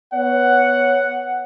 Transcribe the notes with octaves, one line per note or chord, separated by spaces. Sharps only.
B3 C#5 F#5